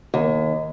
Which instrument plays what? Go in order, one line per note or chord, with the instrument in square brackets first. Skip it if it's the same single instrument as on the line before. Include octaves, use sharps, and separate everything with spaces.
[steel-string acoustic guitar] D#2